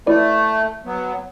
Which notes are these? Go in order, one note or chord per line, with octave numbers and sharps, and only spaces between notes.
A3 E4 B4 D5
F#3 B3